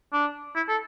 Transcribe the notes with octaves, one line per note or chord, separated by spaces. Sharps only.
D4
E4
A4